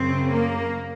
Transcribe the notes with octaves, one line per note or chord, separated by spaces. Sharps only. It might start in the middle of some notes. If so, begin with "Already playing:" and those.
Already playing: F#2 C#3 C4
A#3